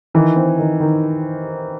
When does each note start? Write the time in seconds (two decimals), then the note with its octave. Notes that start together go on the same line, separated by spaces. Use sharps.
0.14 D#3 E3
0.36 C4
0.59 D#3
0.80 D#3